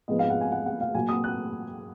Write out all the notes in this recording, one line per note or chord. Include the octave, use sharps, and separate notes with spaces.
G#2 F3 G#3 B3 D#5
F5
F#5
G#5
F#5
F#5
F5
A#2 F#3 A#3 G#5
D#6
F#6